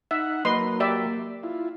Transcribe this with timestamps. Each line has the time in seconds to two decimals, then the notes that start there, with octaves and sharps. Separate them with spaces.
0.11 D#4 E5 F#5
0.45 F#3 A#3 B4 D#5 C6
0.80 G4 D5 E5
1.43 E4 F4